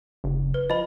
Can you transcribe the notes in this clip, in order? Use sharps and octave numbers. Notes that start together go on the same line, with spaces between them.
F#1
B4
F3 D#5 B5